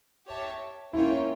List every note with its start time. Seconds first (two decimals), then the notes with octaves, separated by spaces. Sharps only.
0.26 G4 C#5 E5 A5
0.93 A#3 C#4 E4 F4 C#5 G5